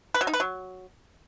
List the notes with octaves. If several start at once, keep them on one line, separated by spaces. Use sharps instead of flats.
B4
F#3
D#4
B4
F#3